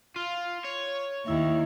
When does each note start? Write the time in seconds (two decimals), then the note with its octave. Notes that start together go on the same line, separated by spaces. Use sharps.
0.16 F4
0.64 C#5
1.26 D#2 D#3 E4 E5